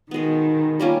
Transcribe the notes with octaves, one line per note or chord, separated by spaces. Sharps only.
B2 D#3 G#3 B3
G3 A#3 C#4 F4